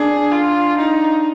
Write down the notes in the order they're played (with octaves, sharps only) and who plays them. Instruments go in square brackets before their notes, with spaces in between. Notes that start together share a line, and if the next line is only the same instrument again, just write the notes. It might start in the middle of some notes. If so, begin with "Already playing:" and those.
Already playing: [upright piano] D4 [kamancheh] G#4
[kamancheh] F4
D#4